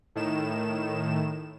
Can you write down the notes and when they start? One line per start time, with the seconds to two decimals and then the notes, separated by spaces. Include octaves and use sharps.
0.15 A2 D#3 E7